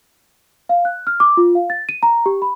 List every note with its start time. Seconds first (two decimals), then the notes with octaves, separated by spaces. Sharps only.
0.69 F5
0.85 F#6
1.07 F6
1.20 D6
1.37 F4
1.55 F5
1.70 A6
1.89 D#7
2.03 A#5
2.26 G4
2.42 B5